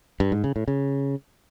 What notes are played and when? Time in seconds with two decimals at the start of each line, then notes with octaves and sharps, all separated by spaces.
0.20 G2
0.32 G#2
0.44 C#3
0.56 A2
0.68 C#3